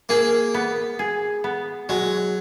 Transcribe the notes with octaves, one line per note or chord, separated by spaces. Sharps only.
A#3 G#4
B3
G#4
B3
F#3 G#3